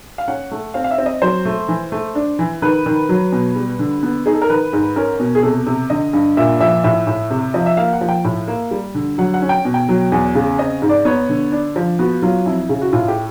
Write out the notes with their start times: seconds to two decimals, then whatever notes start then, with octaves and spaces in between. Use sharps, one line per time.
0.18 F5
0.28 C#4 F#5
0.51 A3
0.74 C4 F5
0.84 F5
0.91 E5
0.98 C4
1.06 D#5
1.22 F#3 C5
1.45 A3
1.68 E3
1.92 A3
2.15 D4
2.39 E3
2.62 D#3 B4
2.86 D#3
3.09 F#3
3.32 B2
3.56 G3
3.79 D3
4.03 B3
4.25 D#4 G#4
4.34 A4
4.42 A#4
4.50 D#3 B4
4.73 G#2
4.96 C#4 A#4
5.20 B2
5.35 G#4
5.43 C3 A4
5.67 C3
5.90 D3 D#5
6.13 G2
6.37 A#2 E5
6.60 F3 E5
6.84 A2 E5
7.07 A2
7.31 C3
7.54 F3 D#5
7.66 E5
7.77 A#3 F5
7.93 F#5
8.01 F3
8.09 G5
8.24 A2
8.48 A#3
8.71 G3
8.95 D3
9.18 F#3 F#5
9.34 F#5
9.42 C#4
9.49 G5
9.65 B2
9.74 G5
9.89 F#3
10.12 E2 F#5
10.35 C#3
10.59 C4 D#5
10.82 G#2
10.89 D5
11.05 B3 C#5
11.29 D3
11.52 D4
11.76 F3
11.99 B3 F#4
12.22 F#3 F4
12.46 F2 E4
12.69 C#3
12.82 F#4
12.93 A2 F4
13.08 G4